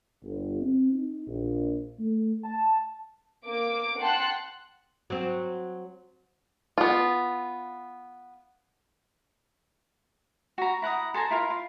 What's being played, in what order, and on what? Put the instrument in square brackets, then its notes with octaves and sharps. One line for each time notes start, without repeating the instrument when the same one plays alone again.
[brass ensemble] G1
C4
D#4
A#1
A3
A5
[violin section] A#3 D6 D7
F#5 G5 A5 C6 F#6
[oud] F#3 C4
[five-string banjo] B3 F4
[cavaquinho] F#4 A#5
E4 F#5 A#5 D#6
A4 C5 G#5 A#5
E4 F4 A#4
F4